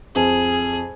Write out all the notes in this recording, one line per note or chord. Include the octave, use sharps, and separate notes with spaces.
F2 G#4